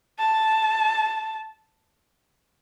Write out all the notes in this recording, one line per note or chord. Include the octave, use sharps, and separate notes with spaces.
A5